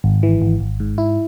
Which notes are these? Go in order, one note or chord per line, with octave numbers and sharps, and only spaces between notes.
G#1
E3
G#1
G#1
G#2
E4